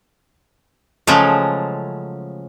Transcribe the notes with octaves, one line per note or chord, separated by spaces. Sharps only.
C#3 F3 F#3 G#3 A3